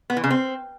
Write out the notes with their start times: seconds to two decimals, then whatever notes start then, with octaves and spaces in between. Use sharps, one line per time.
0.10 B3
0.17 E3
0.24 C#3
0.31 C4